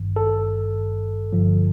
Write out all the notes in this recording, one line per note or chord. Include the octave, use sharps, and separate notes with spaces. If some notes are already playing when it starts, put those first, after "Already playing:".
Already playing: G#1 G2 D#3
A4
G1 G2 D3 F3